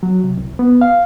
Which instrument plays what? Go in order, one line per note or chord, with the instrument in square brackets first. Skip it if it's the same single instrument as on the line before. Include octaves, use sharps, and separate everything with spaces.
[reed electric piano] F#3
C3
C2
B3
F5